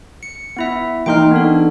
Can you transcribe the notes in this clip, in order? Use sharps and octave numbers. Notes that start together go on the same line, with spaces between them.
C#7
B3 E4 E5
E3 A#3 D#4 G5 C6 F6
B3 D4 A4